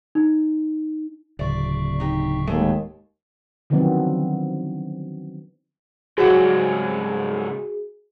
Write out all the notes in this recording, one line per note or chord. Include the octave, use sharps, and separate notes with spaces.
D#4
D1 C#3 D5 E5 C#6
D#4 G4
D#2 G#3 A3
D3 D#3 F3 F#3 B3 C4
G#2 C#3 F#3 G3 C4 F#4 G#4